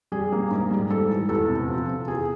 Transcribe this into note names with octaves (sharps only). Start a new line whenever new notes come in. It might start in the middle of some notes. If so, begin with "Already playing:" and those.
G3 G#4
A#3
G#2
G3
G#2 A4
E3
E2 A4
C3
F3
C3
E2 G#4